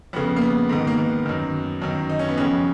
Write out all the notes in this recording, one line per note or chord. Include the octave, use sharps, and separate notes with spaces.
F2 C#3 B3
A#3
B3
G#2 D#3
A#3
B3
F#2 D#3
F#2 D#3
D#4
C#4
B3
F2 C#3 C#4